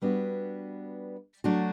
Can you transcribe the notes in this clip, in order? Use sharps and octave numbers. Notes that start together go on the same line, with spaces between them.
G3 B3 D4 F#4
F#3 A3 D4 F#4